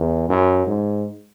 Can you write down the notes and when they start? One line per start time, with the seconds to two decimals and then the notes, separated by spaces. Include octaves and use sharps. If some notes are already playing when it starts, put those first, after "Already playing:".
Already playing: E2
0.29 F#2
0.66 G#2